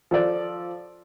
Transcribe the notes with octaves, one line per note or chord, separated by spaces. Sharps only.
F3 A4 D5